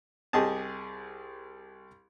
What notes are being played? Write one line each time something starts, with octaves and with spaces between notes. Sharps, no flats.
C2 G4 G#4 D#5 A5